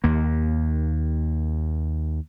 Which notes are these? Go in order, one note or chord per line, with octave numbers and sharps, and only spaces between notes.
D#2 A#3